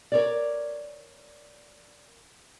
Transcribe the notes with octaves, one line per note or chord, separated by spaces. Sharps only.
A#4 C#5 D5